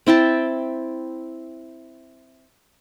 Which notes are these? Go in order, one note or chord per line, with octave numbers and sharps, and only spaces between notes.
C4 E4 G5 A5